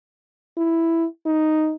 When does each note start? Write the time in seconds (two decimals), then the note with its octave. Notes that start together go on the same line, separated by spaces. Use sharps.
0.57 E4
1.26 D#4